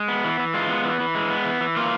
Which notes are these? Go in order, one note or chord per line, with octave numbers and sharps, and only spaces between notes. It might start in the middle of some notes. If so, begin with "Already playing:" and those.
Already playing: G#3
B3
E3
E3
G#3 F4
B3
E3
E3
G#3
B3
E3
E3
A#3 F4